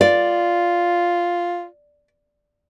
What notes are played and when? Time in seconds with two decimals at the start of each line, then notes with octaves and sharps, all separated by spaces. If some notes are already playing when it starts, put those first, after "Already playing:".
0.01 F4 D5